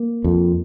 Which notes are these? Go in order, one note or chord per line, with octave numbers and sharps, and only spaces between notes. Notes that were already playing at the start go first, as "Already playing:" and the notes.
Already playing: A#3
F2